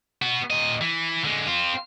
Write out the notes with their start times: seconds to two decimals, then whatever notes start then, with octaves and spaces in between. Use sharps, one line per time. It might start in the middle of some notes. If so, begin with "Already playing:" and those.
0.22 B3 F#4
0.50 A#2 D#5
0.81 E3
1.24 D3 G#3
1.47 C4 F4